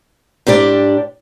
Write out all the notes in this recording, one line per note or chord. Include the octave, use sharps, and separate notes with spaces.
G#2 D4 G4 D5